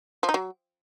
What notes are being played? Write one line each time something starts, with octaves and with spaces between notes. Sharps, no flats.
F3
D#4
F#3